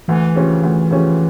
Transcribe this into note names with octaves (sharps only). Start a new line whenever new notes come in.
D2 E3
C#3 F3 C#4 G4
D2
C#3 F3 C#4 G4